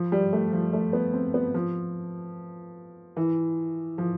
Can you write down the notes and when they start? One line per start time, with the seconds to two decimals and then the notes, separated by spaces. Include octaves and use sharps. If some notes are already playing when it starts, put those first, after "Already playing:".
Already playing: F3
0.12 G3
0.33 A3
0.53 F3
0.73 A3
0.93 B3
1.13 C4
1.34 B3
1.54 F3
3.17 E3
3.98 F3